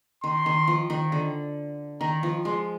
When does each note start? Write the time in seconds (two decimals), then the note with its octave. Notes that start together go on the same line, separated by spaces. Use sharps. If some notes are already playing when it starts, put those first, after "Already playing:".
0.24 D#3 C6
0.46 D#3
0.68 F3
0.90 D#3
1.12 D3
2.01 D#3 A#5
2.23 F3
2.45 G#3 C6